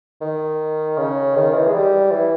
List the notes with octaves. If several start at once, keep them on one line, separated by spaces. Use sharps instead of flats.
D#3
C#3
D#3
E3
G#3
G3
E3